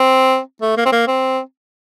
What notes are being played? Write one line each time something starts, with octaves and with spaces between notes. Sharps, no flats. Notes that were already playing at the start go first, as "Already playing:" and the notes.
Already playing: C4
A3
A#3
C4
A#3
C4